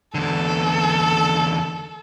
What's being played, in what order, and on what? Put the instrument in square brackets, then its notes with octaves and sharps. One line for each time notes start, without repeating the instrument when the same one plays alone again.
[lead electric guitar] E2 D3 [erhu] A4